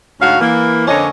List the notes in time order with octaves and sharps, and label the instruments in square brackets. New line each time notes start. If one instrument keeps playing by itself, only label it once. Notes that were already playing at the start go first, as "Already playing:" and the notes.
[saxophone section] D2 G#2 C#4 F#4 F5
E3 A#3
F2 D3 A#3 C#4 C#5 D#5